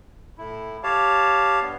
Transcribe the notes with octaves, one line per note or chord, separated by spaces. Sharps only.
A2 E4
G4 C#5 F5 A5
G2 G3 B3